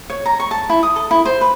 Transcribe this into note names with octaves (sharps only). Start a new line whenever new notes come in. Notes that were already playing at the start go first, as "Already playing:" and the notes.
C#5
A#5
C#6
A5
E4
D#6
A4
E4
C5
B4